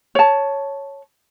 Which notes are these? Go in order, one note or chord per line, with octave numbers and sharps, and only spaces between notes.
C#5 A5